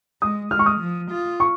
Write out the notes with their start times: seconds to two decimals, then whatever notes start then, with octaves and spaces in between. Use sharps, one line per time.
0.22 G#3 D#6
0.51 G#3 F6
0.59 C#6
0.66 D#6
0.80 F3
1.11 F4
1.40 C#6